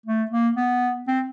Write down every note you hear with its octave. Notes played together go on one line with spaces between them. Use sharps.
A3
A#3
B3
C4